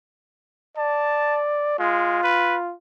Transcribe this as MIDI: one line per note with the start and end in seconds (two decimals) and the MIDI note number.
0.77 1.77 74
0.77 1.39 81
1.79 2.22 56
1.79 2.73 65
2.23 2.57 71